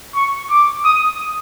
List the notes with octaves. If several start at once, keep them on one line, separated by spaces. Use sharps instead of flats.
C#6
D6
D#6